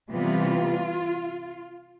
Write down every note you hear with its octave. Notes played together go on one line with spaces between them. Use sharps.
C3 E3 G3 B3 F4